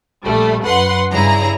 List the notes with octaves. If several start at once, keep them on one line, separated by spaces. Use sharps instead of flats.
A#1 G3 A3
F#2 B4 F#5 C6
G2 C#3 E4 G#4 A#5